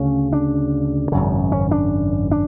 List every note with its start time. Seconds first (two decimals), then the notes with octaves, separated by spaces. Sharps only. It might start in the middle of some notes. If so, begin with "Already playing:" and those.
Already playing: D2 C#3 C#4
0.33 D4
1.12 G#1 F#2 C#3
1.52 C#4
1.71 D4
2.31 D4